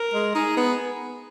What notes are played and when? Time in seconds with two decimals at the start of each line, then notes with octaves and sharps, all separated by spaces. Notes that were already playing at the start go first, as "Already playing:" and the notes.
Already playing: A#4
0.14 G#3
0.35 D#4 G#4
0.57 B3